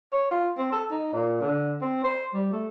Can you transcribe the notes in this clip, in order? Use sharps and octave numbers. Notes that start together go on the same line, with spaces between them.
C#5
F4
C4
A4
D#4
A#2
D3
C4
C5
G3
A3